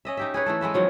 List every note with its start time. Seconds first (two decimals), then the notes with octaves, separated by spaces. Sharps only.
0.05 C#4 D#5 E5
0.17 D#4 G4 E5
0.34 G#4 B4 C#5
0.46 E3 A3 A4
0.61 G#3 A3 B3 E5
0.74 D#3 F3 F#3 C#4